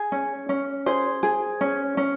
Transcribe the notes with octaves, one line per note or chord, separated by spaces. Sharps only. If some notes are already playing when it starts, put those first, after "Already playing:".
Already playing: G#4
C#4
C#4
G#4 C5
G#4
C#4
C#4